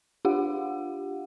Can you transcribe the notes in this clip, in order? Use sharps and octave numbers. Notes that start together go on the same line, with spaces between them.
D4 F4 G4 F5 F#5